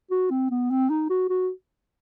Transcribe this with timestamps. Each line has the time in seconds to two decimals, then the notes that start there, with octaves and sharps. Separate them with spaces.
0.11 F#4
0.30 C4
0.51 B3
0.70 C4
0.90 D#4
1.10 F#4
1.30 F#4